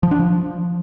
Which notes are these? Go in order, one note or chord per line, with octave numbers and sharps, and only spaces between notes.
F3
D4
F3